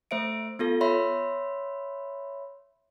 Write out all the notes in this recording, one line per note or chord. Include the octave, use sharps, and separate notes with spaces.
A3 C5 E5 D7
B3 F4 A4
C#5 E5 B5 C6